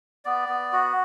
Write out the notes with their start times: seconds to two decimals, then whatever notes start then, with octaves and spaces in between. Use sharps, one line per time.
0.25 B3 D5
0.49 B3
0.73 F#4